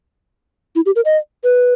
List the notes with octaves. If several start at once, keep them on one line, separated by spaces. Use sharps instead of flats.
E4
G4
A#4
D#5
B4